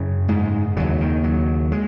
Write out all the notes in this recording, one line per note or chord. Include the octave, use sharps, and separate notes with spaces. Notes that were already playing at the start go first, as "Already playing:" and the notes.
Already playing: F#2 C#3
G#2 G#3
D#2 C#3 F#3
D#3
F#3
G#3